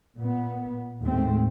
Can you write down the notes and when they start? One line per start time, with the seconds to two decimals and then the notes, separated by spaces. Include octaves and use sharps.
0.17 A#2 B3
1.01 D#2 A2 G#3 A3 C4